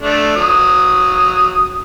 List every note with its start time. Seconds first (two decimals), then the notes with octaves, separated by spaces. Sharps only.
0.03 A3 D4
0.36 F#3 D#6